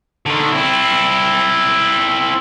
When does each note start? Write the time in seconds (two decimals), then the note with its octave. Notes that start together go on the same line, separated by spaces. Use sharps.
0.26 D3 D#3
0.52 C4 E4